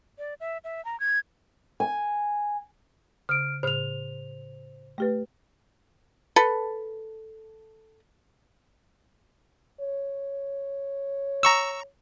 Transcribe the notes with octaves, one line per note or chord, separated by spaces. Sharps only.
D5
E5
E5
A#5
G#6
G#5
C#3 F6 D7
A2 C#3 C5 F6 F7
A3 G4 B4
A4 B4
C#5
A#5 C#6 E6